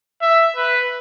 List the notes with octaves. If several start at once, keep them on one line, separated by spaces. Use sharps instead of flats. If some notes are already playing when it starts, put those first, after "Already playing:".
E5
B4